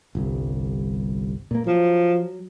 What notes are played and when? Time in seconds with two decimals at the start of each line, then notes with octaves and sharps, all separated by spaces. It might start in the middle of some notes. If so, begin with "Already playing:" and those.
0.15 G1 C2
1.51 A#2 A#3
1.67 F3 F#3